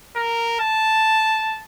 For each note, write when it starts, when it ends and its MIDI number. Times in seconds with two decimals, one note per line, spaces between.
0.16 0.57 70
0.60 1.61 81